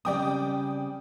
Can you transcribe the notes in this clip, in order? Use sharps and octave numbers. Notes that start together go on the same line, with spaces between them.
C#3 G3 C4 D5 G5 D#6